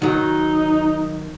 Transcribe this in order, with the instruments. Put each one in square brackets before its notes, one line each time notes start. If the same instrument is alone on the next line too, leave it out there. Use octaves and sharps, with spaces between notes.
[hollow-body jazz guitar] D#3 F#3 [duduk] D#4